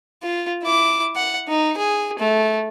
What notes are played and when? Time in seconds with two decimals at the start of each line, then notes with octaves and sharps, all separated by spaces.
0.23 F4
0.63 E4 D6
1.16 F#5
1.48 D#4
1.78 G#4
2.19 A3